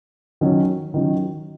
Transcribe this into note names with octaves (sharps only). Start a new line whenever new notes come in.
D#3 F#3 C#4
D#3 F#3 C#4